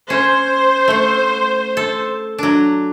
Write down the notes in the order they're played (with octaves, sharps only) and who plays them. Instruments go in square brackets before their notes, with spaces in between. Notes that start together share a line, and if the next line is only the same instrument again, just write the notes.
[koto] C#4 [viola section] C5
[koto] A3 F#5
A4
F#3 D4